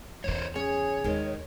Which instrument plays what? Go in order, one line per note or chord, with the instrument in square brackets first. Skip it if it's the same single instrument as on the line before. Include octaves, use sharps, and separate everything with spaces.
[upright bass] E2 C#3 [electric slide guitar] A#4 C5 C#5
[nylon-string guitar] C#4 [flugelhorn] G#4 [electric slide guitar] C#5
[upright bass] D#2 [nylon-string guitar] D#3 G#3